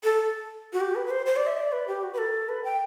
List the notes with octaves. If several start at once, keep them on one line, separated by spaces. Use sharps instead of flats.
A4
F#4
G4
B4
B4
C5
C5
D5
E5
D5
B4
G4
F#4
B4
A4
B4
G5